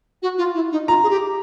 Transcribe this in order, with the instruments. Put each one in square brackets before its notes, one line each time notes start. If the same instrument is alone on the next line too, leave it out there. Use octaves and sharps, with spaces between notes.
[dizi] F#4
F4
E4
D#4
[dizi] F4 [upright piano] A#5
[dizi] G#4
G4